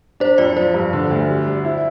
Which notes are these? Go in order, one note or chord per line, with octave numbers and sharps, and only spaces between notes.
D4 C5
F2 D5
F3 C5
G2
D3
D2
G3
G3
E4